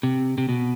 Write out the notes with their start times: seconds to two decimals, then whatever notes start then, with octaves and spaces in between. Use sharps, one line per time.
0.03 C3
0.38 C3
0.49 B2